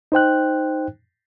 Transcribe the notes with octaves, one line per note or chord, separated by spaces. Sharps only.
D#4 C5 G5 F#6